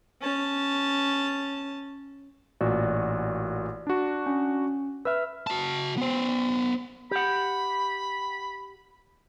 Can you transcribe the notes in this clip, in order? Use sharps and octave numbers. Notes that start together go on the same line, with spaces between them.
C#4 A5
A1 A#2 F#4 D5
D4 F#4
C#4
B4 E5 E6 F6
F#4 A5
B3 C5
G4 F#5 B5